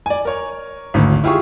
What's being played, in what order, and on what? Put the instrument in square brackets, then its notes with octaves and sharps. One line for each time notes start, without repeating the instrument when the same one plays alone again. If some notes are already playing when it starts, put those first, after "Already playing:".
[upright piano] D5 G#5
A#4 C#5
G#1 D2
E4 F4 G4 G#4 C#6